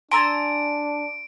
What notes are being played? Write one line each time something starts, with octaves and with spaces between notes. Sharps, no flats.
D4 G#5 A#5 C6 E6 A6 D7